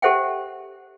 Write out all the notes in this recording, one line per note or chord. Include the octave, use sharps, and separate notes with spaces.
G4 A4 C5 E5 F#5 G5